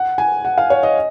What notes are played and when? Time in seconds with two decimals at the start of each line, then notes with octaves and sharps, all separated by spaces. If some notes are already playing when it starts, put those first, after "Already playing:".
Already playing: F#5
0.18 G#5
0.45 F#5
0.58 F5
0.70 C#5
0.83 D#5